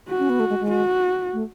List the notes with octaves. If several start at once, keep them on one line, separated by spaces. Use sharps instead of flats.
F#4
C#4
B3
A3
G#3
G#3
F#4
A3